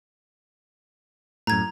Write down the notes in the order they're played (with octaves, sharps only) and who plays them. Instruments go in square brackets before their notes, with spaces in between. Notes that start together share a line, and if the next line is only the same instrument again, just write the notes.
[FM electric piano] F#2 A2 [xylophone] A#5 G#6